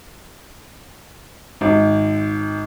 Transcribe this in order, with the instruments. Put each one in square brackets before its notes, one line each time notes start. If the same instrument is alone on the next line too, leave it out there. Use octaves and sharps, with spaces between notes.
[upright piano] G#1